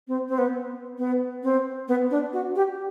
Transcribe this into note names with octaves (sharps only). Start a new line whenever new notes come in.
C4
C4
B3
B3
C4
B3
D4
F#4
G4